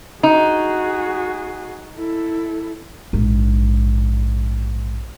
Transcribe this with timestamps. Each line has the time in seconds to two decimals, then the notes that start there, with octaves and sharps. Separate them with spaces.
0.23 D#4 F#4 G#4
1.96 E4 A4
3.13 A#1 G#2